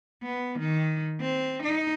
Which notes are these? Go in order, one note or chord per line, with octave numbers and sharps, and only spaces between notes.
B3
D#3
C4
D#4